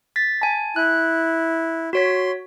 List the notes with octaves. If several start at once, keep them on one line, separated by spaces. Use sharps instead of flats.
A6 B6
G#5 A5
E4 F#6
F#4 C#5 C6 B6